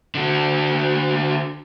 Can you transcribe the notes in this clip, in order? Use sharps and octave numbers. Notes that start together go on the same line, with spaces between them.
D3 F#4